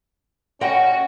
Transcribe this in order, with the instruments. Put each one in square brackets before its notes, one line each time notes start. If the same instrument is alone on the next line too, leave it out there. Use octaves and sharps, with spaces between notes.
[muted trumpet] C#4 [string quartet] F#4 [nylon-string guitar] D#5 F#5 G5